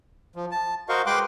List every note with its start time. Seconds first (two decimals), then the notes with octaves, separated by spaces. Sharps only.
0.36 F3
0.51 A5
0.89 F#4 A#4 C5 D#5 F5 C#6
1.06 G#3 B4 G5 C6 D6 F#6